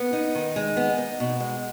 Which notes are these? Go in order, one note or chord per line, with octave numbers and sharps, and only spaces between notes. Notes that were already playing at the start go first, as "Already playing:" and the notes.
Already playing: B3
D#4
D#3
G#3
B3
D#4
B2
G#3